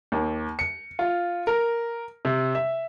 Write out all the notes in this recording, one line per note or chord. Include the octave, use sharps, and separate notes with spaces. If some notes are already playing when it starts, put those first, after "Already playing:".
D#2
C#7
F4
A#4
C3
E5